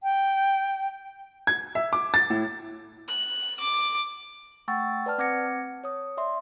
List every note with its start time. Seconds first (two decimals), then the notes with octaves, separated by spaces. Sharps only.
0.03 G5
1.47 G#6
1.75 E5
1.93 D6
2.14 A6
2.30 A2
3.08 F#6
3.60 D6
4.68 A3 F#5 G5 C#6 E6 A6
5.06 B4 D5 A5 F6
5.18 C4 F#5 D6 G#6 A#6 C#7
5.84 C#5 D#6
6.17 D5 E5 C6